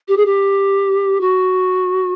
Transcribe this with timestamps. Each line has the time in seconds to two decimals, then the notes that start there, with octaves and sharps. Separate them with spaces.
0.08 G4
0.17 G#4
0.26 G4
1.21 F#4